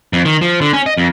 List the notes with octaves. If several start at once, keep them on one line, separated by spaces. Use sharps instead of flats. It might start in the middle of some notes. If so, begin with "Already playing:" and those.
F2
D#3
F3
D3
C#4
D#5
F2